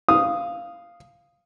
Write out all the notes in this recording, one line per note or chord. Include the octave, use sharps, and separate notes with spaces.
F5 D#6